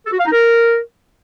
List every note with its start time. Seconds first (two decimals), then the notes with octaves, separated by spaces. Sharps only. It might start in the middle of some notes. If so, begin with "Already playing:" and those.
0.05 A4
0.12 F#4
0.18 F5
0.25 D#4
0.31 A#4